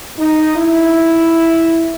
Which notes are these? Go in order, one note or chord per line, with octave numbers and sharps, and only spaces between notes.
D#4
E4